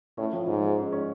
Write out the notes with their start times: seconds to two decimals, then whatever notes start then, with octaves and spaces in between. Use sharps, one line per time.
0.17 A2 C#4
0.33 F3
0.47 G#2 F3
0.63 G#3
0.78 C#4
0.92 C#4